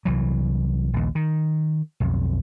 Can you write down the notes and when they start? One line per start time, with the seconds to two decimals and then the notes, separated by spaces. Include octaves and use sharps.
0.05 C2 E3 F#3
0.93 A#1 D#2
1.15 D#3
2.00 B1 F2